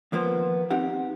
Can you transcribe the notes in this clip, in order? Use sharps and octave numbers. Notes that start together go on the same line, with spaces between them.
D#2 F3 A#3 B3 C5
C4 D#4 G4 F#5